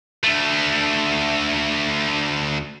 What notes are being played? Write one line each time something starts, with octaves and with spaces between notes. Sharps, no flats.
D2 A3